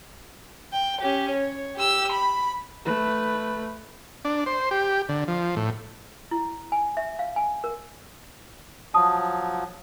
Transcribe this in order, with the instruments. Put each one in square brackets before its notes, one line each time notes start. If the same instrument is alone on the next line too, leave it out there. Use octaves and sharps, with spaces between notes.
[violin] G5
C#4 G4
C#5
G4 E6
B5
[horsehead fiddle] A3 B4
[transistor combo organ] D4
C5
G4
D3
F3
A2
[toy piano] E4
G#5
E5
F5
G#5
A#4
[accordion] F3 F#3 [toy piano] A5 D#6